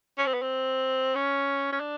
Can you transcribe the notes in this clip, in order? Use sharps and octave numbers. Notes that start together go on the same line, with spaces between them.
C#4
C4
B3
C4
C#4
C#4
D4